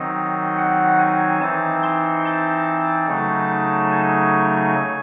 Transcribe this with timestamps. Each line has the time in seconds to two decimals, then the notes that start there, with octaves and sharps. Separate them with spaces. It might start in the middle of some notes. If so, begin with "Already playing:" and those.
Already playing: D#3 F#3 C4 D#4 D#5
0.58 F#5
0.99 G#5
1.41 E3 C4 D#4 A5
1.83 C6
2.25 A5
3.08 C#3 F#3 A3 D#4
3.91 G#5